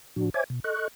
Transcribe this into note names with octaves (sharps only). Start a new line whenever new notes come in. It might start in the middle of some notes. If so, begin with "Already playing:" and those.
A2 F3 D4 F#4
C5 C#5 E5 G#5 D6 G#6
B2
A4 D#5 C#6 F#6